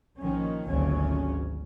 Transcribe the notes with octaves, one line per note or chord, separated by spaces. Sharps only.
A#1 D#3 F3 C#4
G#1 D2 A#2 C#3 F#3 C#4